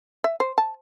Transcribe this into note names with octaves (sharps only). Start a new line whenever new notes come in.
E5
C5
A5